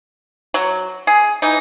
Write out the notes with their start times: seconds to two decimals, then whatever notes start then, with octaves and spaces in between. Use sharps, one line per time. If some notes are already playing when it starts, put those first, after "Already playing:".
0.54 F#3
1.07 G#4
1.42 E3 D#4